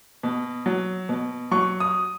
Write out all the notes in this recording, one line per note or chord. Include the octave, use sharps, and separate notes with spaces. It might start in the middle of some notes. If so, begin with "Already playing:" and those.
B2
F#3
B2
F#3 C#6
D#6